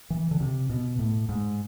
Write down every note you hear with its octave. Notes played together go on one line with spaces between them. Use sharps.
E3
D3
C3
B2
A2
G#2